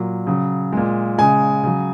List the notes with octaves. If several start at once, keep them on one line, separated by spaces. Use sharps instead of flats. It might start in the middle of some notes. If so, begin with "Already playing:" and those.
Already playing: A#2 F#3
C#3 F#3
A#2 G#3
C#3 G#3 G#5
C#3 F#3